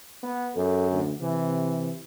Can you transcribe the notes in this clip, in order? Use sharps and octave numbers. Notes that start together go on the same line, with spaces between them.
B3
F#2 A4
D2
C3 E3